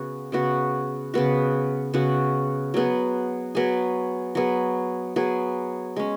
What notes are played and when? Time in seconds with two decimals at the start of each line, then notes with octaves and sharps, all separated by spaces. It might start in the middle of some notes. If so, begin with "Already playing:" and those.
Already playing: C#3 B3 F#4
0.32 C#3 B3 F#4
1.14 C#3 B3 F#4
1.94 C#3 B3 F#4
2.74 F#3 B3 G#4
3.55 F#3 B3 G#4
4.35 F#3 B3 G#4
5.16 F#3 B3 G#4
5.96 G#3 C#4